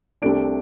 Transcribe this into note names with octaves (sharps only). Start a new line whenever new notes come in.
C2 C3 A3 D4 D7